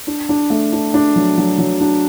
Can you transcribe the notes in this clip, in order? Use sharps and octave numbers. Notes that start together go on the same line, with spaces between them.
D4
D4
A3
D4
D4
F#3
F#3
F#3
D4